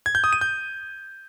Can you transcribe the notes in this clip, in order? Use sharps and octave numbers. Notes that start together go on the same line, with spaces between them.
G#6
G6
D#6
D#7
G6